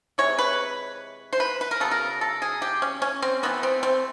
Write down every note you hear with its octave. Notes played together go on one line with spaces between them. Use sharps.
C3 E3 G#3 C#5
B4
C5
B4
B4
A#4
C#3 F#3 B3 A4
A#4
A4
G#4
G4
C#4
C#4
C4
E3 A3 B3
C4
C4